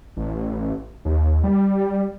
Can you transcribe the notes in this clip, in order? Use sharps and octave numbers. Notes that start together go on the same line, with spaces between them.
A1
D#2
G3